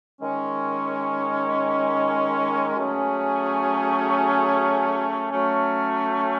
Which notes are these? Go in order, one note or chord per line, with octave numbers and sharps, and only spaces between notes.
D#3 G#3 C#4
F#3 A3 C#4 G#4
F#3 A3 C#4